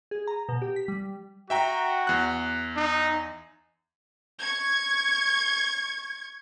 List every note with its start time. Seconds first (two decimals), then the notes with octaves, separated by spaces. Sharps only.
0.11 G#4
0.27 A#5
0.49 B2
0.62 G4
0.76 B6
0.88 G3
1.50 F#4 E5 G5 A#5
2.07 E2 F#6
2.76 D#4
4.40 C#6 G#6